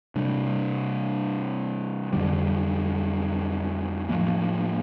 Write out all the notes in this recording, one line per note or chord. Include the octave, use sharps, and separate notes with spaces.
C3 G3 D4
F2 D3 G3
A2 F3 A#3